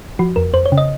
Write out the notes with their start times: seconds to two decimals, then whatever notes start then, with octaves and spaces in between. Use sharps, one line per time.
0.19 F3 F#4
0.36 F2 A#4
0.53 F2 C5
0.66 C#5
0.72 C#3
0.78 D#5